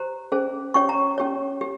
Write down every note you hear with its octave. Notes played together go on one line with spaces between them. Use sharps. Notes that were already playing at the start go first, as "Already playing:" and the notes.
Already playing: G4 C5 A#5
C#4 G#4 C5
C#4 G4 C#5 C#6
A#5
C#4 G4 C#5
G4